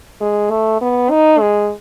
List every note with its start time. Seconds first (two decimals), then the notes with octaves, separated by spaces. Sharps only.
0.21 G#3
0.50 A3
0.81 B3
1.10 D#4
1.40 G#3